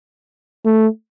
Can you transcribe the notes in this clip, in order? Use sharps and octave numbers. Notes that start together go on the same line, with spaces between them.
A3